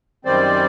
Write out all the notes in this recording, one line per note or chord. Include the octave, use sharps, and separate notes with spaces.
F#2 D#3 G3 C4 C5 D5